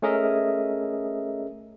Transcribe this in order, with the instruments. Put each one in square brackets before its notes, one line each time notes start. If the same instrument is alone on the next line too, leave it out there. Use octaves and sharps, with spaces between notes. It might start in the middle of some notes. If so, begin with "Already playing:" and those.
[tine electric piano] A3 C#4 G#4 A#4 D#5 E5